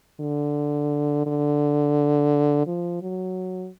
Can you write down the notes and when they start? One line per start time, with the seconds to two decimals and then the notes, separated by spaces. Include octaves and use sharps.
0.20 D3
1.26 D3
2.67 F3
3.02 F#3